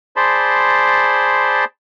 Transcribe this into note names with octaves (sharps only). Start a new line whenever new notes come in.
G#4 C5 D5 A5 B5 C6